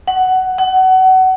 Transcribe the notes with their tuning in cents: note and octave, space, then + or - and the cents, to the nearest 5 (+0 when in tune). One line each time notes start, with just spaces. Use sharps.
F#5 +10
F#5 +25